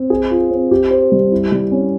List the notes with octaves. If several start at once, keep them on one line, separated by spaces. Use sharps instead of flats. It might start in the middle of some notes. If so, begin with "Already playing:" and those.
Already playing: C4
G#4
F4
C4
G4
C5
G3
E4
G3
C#4